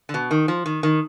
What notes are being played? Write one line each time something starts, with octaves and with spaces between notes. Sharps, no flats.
D3
B2
D#3
F3
D#3
D#3